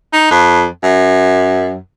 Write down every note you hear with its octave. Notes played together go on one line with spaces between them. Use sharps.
D#4
F2
F#2